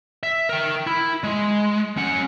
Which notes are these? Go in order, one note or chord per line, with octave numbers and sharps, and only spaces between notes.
E5
A#4 G5
E4
G#3
C#4 F#5